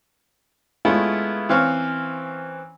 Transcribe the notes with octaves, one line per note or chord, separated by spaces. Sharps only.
G#3 A3 B3 C#4 E4 F4
E3 C4 C#4 F5 C#6